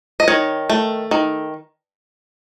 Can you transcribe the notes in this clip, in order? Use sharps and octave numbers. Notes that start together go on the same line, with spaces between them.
D#5
D#3 C#5
A3
D#3